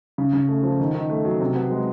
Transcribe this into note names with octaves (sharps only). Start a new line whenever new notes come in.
C#3
C#3
A3
F3
D#3
D#3
A3
F#3
C3
B3
G#3